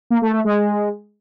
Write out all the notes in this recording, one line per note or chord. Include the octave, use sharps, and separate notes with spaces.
A#3
A3
A3
G#3